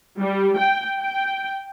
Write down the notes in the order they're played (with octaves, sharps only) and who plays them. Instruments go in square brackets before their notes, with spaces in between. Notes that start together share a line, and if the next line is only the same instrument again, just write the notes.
[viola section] G3
G5
G5